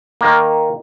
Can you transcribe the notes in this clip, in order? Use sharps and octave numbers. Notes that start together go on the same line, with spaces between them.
D#3 A#3